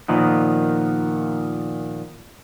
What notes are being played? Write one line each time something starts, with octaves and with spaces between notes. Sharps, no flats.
A#2 D#3 F3 B3